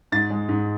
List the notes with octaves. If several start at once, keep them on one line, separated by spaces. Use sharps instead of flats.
G#2 A6
G#3
G#2